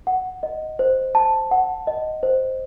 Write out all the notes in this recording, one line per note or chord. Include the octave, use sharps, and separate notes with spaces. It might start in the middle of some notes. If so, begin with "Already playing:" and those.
F#5
D#5
C5
A5
F#5
D#5
C5